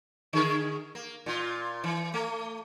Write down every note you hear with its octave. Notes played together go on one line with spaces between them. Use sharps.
D3 G#4 A#4
A#3
A#2 F4
E3
A3